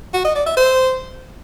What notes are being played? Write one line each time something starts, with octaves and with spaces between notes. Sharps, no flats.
F#4
D#5
D5
E5
C5